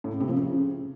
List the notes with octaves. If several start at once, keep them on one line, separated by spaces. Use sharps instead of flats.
A2
C#3
C3
F3
C#3